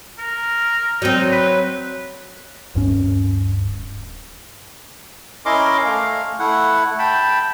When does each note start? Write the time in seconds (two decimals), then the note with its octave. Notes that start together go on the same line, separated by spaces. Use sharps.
0.19 A#4
1.02 F#3 C4 D#4
1.32 B4
2.75 D1 G2 C#4
5.46 C#4 E4 A#4 D#5 C6 D6
5.85 A3 F5
6.39 A3 E4 F#5
6.99 G5 A5 B5